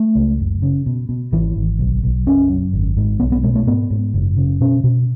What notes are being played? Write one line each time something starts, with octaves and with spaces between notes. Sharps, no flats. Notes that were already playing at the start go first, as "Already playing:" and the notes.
Already playing: A3
C#2
F#1
C#3
B2
B2
G#1 E3
G#1
B1
B1
F#1 C#4
F#2
G#1
G#2
B1 B3
B3
B2 G#3
A3
G#2 B3
G#2
F#1
C#3
B2 C#4
B2